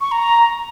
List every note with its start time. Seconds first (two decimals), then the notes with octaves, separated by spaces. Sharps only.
0.01 C#6
0.12 A#5